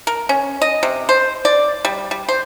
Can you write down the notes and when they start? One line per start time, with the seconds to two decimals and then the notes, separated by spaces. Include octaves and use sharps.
0.07 A#4
0.29 C#4
0.62 D#5
0.83 C3
1.09 C5
1.45 D5
1.85 G3
2.11 G3
2.28 C5